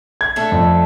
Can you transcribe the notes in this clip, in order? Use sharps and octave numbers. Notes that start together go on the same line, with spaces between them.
G#6
A3 D4 A4
F2